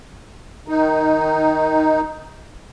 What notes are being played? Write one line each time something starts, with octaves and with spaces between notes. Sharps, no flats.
D#3 D#4